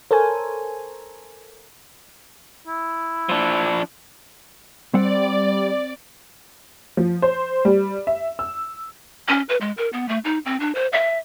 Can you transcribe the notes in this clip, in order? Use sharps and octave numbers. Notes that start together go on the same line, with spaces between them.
A4 A#4 C5 C#5 G#5
E4
F3 D4
G3 C4 D5 F#5
F3
C5
G3
E5
E6
C#4
B4
G#3
A#4
B3
A3
D#4
C4
D4
C5
E5